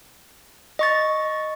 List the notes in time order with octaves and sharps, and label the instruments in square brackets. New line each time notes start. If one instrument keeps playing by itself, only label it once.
[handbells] D#5 C#6 A6